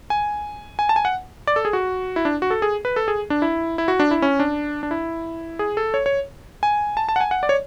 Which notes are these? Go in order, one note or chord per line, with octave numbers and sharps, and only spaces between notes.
G#5
G#5
A5
G#5
F#5
D5
A4
G#4
F#4
E4
D4
F#4
A4
G#4
B4
A4
G#4
D4
E4
E4
F#4
D4
E4
C#4
D4
D4
E4
G#4
A4
C#5
C#5
G#5
A5
A5
F#5
G#5
F#5
D5
C#5